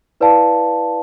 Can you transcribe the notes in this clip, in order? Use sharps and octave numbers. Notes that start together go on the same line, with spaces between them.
E4 B4 D5 F5 A5